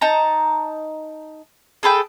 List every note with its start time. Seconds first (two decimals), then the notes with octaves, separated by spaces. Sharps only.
0.01 D#4 A5 A#5
1.83 G#4 A4 B4 G5